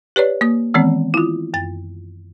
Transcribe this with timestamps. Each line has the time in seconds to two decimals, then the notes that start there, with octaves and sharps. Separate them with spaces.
0.16 G4 B4 C#5 D5
0.41 A#3 D#6
0.74 D#3 E3 G#3 B3 C4
1.14 E4 F4
1.54 F#2 A6